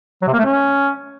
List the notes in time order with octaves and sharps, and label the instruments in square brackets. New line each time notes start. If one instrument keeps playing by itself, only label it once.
[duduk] F#3
C3
A#3
A3
C#4